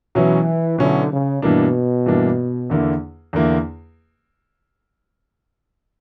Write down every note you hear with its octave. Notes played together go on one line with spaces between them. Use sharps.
B2 E3 F#3 C#4 E4
B2 D3 F#3 C#4 E4
C#3
G2 B2 E3 A#3 D4
G2 E3 A#3 D4
E2 D3 A#3 E4
E2 D3 A#3 E4